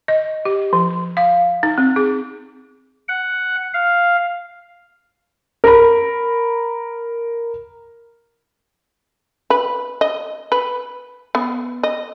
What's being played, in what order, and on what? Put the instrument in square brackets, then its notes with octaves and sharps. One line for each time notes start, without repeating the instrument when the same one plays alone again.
[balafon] D#5
G4
F3
F5
D#4
C4
G#4
[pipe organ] F#5
F5
[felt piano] A#4 B5
[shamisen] B4
D#5
B4
B3
D#5